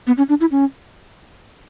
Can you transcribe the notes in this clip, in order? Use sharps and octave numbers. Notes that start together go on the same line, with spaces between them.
B3
C#4
D4
E4
C#4